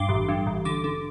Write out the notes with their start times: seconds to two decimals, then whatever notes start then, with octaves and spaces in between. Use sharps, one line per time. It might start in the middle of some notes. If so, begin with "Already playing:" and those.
Already playing: G2 C6 D6
0.09 A1
0.29 G2
0.47 A1
0.65 D3 D6
0.84 D3